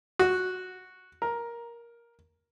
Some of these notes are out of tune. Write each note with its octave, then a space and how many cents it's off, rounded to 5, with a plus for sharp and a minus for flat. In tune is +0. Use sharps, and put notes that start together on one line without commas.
F#4 -5
A#4 +10